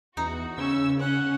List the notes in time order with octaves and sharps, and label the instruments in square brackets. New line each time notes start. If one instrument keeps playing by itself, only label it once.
[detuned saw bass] E2 [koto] D#4 [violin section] F#4
[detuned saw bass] C#3 [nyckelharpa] C#4 [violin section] E6
[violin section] C#4 [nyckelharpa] F#5